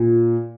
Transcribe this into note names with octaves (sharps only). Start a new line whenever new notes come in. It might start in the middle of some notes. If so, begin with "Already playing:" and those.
Already playing: A#2